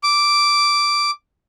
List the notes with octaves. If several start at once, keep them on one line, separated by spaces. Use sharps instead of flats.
D6